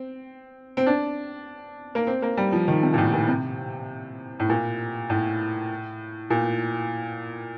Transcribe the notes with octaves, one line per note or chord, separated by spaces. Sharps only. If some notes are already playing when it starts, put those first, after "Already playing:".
Already playing: C4
C4
D4
A#3
C4
A#3
G3
F3
D#3
C3
A#2
A2
A#2
C3
A2
A#2
A2
A#2